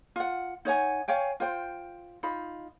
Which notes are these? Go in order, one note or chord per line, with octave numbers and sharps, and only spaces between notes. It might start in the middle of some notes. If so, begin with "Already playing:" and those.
F4 F#5
D#4 C#5 F#5 G#5
C#5 F5 G5 G#5
F4 C5 G5
D#4 F4 B5